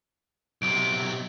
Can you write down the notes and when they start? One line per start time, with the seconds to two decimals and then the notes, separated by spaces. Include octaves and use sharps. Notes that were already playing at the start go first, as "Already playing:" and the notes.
0.62 B1 C3 D7